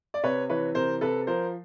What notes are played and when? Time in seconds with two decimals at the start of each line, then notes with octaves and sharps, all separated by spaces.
0.14 D5
0.24 C3 B4 C#5
0.49 E3 B4 C#5
0.75 C3 A#4 C5
1.01 C3 A4 B4
1.27 F3 A#4 C5